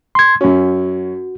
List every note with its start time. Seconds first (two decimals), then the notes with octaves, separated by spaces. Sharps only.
0.15 C6 G#6
0.41 F#2 C#4 F#4